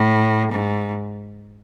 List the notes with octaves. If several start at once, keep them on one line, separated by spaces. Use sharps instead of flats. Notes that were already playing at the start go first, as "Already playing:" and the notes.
Already playing: A2
G#2